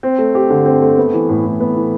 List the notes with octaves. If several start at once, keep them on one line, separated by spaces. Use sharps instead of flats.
C4
A3
G4
D3
C4
A3
B3
E3
A2
A2
B3
E3